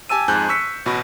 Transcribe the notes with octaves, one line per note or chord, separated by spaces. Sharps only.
G4 G#5 A5 E6 D#7
F2 G#2 G#5 A5 F#6 G6
C#6 E6 B6 C#7
A1 B2 F#4 B5